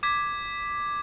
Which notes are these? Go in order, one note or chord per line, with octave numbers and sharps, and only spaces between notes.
D6 G#6 B6